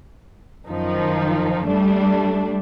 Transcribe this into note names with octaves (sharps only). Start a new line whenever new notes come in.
F#2 D#3 F3 D#4
G3 A3 D4